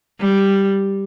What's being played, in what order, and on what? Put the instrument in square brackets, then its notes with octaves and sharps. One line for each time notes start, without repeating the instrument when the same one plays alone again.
[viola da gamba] G3